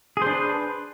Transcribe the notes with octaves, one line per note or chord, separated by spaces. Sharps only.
D4 G#4 B4 C5